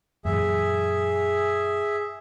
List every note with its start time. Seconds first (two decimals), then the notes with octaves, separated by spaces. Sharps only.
0.25 F#2 A#2 E3 G#4 E5